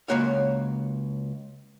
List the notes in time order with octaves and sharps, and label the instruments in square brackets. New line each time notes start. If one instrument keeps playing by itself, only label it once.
[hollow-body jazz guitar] C#2 G#3 A#3 F#4 C#5 F5